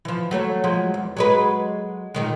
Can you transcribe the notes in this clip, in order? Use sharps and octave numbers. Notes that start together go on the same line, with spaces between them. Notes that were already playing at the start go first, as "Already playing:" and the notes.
E3 F3
F#3 A3 C#5
F3 F#3 G#3
E2
F#3 G#3 B4
A#2 D#3 G#3